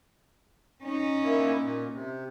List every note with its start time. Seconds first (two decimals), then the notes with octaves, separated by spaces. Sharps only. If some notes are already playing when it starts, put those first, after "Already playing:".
0.83 C#4 D#4
1.24 A#2 A#3 E4
1.62 A#2
1.93 C3